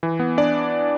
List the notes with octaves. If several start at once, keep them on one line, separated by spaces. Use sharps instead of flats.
E3
B3
D4 D5